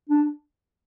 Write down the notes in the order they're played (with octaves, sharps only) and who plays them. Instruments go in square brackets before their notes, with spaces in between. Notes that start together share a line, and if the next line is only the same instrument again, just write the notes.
[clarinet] D4